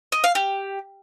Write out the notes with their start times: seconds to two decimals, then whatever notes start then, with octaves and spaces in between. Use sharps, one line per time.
0.12 D#5
0.24 F5
0.35 G4